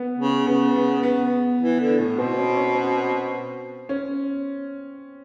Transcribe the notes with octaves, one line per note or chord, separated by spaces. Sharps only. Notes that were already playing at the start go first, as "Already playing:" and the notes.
Already playing: B3
C#3
C#3 B3
B3
B3
E3
D3
A2
B2 C4
C#4
C#4
C4
C#4